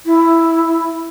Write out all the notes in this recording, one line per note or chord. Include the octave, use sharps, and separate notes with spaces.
E4